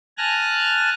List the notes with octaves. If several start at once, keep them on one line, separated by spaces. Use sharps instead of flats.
G#5 A5 F6 F#6 A#6